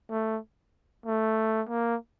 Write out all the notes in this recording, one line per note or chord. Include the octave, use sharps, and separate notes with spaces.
A3
A3
A#3